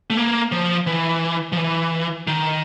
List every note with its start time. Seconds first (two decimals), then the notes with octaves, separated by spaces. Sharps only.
0.10 A3
0.17 A#3
0.52 F3
0.87 E3
1.52 F3
1.57 E3
2.27 D#3